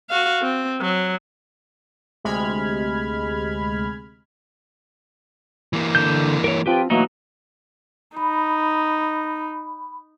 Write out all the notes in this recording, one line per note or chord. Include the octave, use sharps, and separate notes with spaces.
F#4 F5
C4
F#3
D2 C3 G#3 B5 F6 G#6
E3 A#3
D3 G6
A#4 C#5
F3 C4 F4 G4 B4 G5
B2 E3 F#3 A3 A#3 D#4
D#4 B5